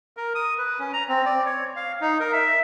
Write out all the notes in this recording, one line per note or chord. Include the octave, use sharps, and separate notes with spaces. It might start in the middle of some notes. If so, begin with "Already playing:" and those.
A#4
D#6
B4
C#4
A#5
C4
D5
C#5
F5
D#4
A#4
E5